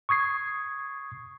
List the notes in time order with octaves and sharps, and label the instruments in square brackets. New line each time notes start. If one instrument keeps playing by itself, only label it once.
[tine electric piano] C#6 D#6 G#6 C7